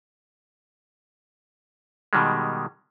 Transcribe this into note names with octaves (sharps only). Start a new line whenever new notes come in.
B2 D#3 G3 G#3